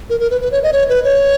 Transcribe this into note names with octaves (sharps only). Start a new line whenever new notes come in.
A#4
A#4
B4
B4
C#5
D#5
C#5
B4
C#5